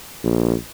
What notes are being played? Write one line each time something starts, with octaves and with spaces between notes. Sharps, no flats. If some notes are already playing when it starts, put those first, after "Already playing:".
A#1